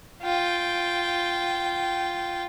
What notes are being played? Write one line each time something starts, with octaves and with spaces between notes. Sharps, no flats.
F4 G5